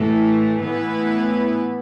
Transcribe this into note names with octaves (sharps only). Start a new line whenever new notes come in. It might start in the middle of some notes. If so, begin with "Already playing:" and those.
Already playing: A2 E3 A3
A2 E3 B3 E4 B4